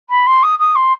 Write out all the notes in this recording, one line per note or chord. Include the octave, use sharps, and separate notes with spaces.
B5
C6
D#6
D#6
C6